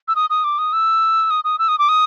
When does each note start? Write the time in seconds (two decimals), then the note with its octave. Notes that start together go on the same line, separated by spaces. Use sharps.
0.08 E6
0.16 D#6
0.30 D#6
0.44 D6
0.59 D#6
0.73 E6
1.30 D#6
1.44 D#6
1.59 E6
1.68 D#6
1.79 D6
1.89 D#6